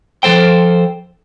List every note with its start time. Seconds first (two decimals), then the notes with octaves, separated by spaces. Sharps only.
0.23 F3 A4 C5 G5